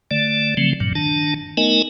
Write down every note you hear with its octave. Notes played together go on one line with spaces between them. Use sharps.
D3 A3 D5
C#3 F3 F#3 A3 C4
G2 A#2 F#3
D#3 D4 A5
A3 B3 D#4 A#4 D#5 G#5